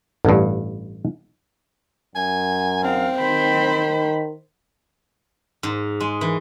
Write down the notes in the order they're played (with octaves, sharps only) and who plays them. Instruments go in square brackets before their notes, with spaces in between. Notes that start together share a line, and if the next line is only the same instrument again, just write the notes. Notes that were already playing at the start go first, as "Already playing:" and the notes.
[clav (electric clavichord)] A1 G2
[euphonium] F#2 [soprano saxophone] G#5
[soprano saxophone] C4 [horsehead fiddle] F5
[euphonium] D#3 [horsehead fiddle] C5 B5
[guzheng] G#2
G#3
E3